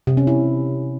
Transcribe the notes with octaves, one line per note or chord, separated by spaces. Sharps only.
C3
C#4
E4